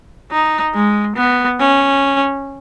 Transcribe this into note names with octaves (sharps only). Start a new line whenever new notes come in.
D#4
G#3
B3
C#4